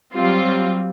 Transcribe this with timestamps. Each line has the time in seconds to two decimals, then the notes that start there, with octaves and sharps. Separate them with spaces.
0.15 F#3 G3 C4 F4